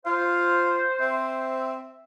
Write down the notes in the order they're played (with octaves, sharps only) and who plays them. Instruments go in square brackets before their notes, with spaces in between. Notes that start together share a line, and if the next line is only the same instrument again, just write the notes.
[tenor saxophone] F4 [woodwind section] C5 [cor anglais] F5
[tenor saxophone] C4 [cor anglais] E5